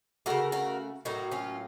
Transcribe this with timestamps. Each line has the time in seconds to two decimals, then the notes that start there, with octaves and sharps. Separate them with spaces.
0.26 C#3 A3 F#4 A#4
0.52 F#4 A#4
1.05 A2 F#3 A#3 D#4 F#4
1.31 C#4 F4